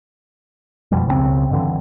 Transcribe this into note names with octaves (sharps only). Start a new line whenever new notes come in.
F2 B2 F3 G3
C#2 C#3 G3 C4
G2 D3 E3